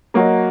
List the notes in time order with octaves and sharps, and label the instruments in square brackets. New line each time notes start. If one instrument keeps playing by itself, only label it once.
[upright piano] F#3 A#3 F#4 D#5